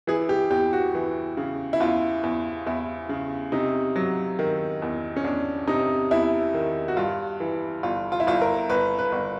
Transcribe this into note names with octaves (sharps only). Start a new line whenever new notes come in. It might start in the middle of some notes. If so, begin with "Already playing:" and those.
E3 G#4
G4
E2 G4
F#4
E3
C#3
E4
E2 F4
E2
E2 E4
C#3
C3 D#4
F#3
D#3
E2
C#4
E2 D4
C3 D#4
E2 E4
D#3
F#4
G2 F4
E3
G1 F4
F4
E4
G1 F4
A#4
G1 B4
B4
G1